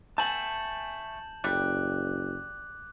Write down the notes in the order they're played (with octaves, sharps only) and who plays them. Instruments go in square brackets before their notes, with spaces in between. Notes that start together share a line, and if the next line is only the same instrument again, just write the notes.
[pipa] A3 B3 [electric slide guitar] G#5 A5 [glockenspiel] G6 E7 F#7
[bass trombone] F#1 [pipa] G3 G4 [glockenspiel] D6 F#6